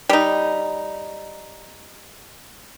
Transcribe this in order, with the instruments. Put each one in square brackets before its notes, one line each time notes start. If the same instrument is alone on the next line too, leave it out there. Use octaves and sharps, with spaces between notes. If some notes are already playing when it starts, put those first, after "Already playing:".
[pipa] G3 D#4